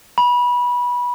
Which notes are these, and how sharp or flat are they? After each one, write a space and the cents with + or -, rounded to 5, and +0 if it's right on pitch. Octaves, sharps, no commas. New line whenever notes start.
B5 -20